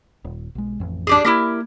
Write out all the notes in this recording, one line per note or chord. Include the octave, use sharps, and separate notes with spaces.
D#1
B1 G#3
A1 F2
D4 G4 G#4
A#3 E4 G4 A#4